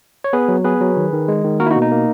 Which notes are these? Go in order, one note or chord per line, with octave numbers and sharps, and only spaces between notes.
C#5
B3 G#4 B4
F#3
B3 G#4 B4
F#3
D#3
D#3
G#3
D#3
A#3 F#4 A#4
E4
D#4 F#4
B2
D#4
A#3